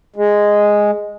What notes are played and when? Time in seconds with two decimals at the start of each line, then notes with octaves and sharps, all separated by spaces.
0.16 G#3